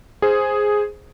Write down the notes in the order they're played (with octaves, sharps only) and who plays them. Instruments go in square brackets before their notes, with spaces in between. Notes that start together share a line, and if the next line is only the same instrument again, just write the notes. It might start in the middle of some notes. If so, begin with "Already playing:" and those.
[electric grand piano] G#4 C5